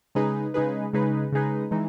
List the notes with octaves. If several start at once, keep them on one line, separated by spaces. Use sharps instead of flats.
C#3 G#3 D#4 G#4 B4
C#3 G#3 D#4 G#4 B4
C#3 G#3 D#4 G#4 B4
C#3 G#3 D#4 G#4 B4
E3 G#3 D#4